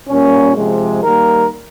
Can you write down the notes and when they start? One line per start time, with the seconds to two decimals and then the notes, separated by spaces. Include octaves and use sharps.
0.09 A#2 G3 A#3 C#4
0.56 C3 F3 G#3
1.03 D#3 G3 A#3 A#4